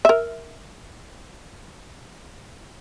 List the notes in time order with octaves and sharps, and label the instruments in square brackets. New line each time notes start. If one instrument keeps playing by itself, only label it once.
[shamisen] A#4 E5